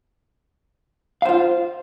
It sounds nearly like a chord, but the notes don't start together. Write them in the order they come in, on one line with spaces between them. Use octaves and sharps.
F5 C5 F4